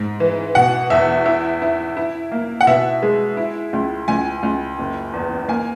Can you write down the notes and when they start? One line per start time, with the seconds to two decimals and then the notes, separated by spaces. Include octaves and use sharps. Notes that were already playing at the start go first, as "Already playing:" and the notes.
Already playing: G#2
0.20 E3
0.55 B2 F#5
0.90 E2 E5
1.26 E4 E5
1.62 E4
1.97 E4
2.32 A#3
2.61 F#5
2.67 B2 E5
3.03 G#3
3.37 E4
3.73 C#2
4.08 C#2 G#5
4.43 C#2
4.79 F#1
5.13 E2
5.48 A#3 G#5